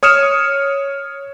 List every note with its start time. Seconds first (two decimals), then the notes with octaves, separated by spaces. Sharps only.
0.03 C#5 D#6 F6 C#7 E7